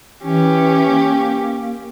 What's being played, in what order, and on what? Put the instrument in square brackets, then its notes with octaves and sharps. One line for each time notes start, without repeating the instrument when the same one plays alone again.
[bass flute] E3 [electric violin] C#4 G4
[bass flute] A#3